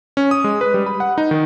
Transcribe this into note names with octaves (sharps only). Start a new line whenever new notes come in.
C#4
D#6
G#3
B4
G3
B5
F#5
D#4
D#3